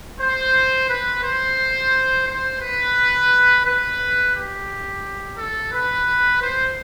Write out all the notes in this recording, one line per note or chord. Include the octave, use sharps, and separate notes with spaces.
C5
B4
C5
C5
B4
B4
G4
A4
B4
C5